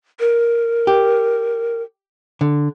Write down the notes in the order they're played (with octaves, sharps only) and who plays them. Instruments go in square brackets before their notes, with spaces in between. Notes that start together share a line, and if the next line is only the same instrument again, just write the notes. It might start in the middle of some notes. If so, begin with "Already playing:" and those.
[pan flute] A#4
[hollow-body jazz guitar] G4
D3